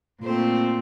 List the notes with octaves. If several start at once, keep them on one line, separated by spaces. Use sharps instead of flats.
A#2 A3 C4 C5